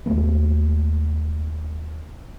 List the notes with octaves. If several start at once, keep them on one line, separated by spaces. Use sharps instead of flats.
D#2 G#3 A3 B3